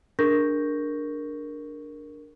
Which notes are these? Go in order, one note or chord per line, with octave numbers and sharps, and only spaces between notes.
D4 G#4 A#4 C#6 G6 A#6